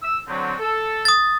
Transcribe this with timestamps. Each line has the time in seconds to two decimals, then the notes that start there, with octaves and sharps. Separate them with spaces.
0.02 E6
0.28 D3 F#3 C4
0.59 A4
1.05 D#6 A6